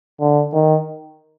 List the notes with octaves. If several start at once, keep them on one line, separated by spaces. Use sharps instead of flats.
D3
D#3